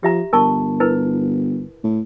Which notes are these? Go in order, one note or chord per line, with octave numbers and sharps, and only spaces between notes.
F3 G4 E5 A#5
G1 A#4 A5 C#6
E4 A#4 B4
A2